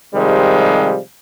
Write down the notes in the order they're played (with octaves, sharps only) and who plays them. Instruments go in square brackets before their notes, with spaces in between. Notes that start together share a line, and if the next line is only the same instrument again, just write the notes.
[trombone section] C3 D#3 F3 G3 G#3